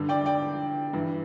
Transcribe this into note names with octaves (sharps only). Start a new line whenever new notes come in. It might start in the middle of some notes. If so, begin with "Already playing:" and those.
Already playing: G2 D3
D5 G5
D5 G5
G2 E3